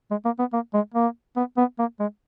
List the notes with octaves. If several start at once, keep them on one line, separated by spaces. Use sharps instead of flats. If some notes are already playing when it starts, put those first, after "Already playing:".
G#3
A#3
B3
A#3
G#3
A#3
B3
B3
A#3
G#3